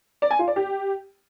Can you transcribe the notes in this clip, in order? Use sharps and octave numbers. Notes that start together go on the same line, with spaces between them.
D5
G#5
F4
D5
G4